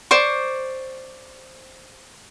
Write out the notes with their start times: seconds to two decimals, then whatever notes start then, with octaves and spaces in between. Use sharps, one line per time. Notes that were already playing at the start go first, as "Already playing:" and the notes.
0.11 C5 D5 C#6